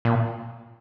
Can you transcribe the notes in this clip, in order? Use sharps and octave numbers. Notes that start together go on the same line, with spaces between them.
A#2